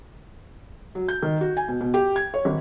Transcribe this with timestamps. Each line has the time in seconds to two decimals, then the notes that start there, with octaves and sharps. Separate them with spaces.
0.95 F#3
1.08 G6
1.22 D#3
1.41 F#4
1.57 G#5
1.68 B2
1.81 B2
1.94 G4
2.16 G#6
2.34 C#5
2.45 G#1